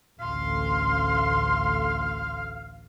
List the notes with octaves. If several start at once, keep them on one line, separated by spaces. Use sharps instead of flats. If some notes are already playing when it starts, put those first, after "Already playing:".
A1 D2 F5 C6